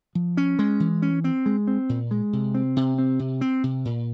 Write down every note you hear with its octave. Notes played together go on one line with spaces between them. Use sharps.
F3
C#4
G#3
E3
C#4
C4
G#3
C4
A#2
G#3
C3
C4
C3
C4
C3
C4
C3
A#2